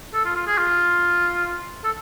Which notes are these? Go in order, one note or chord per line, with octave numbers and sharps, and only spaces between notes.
A4
F4
F4
G#4
F4
A4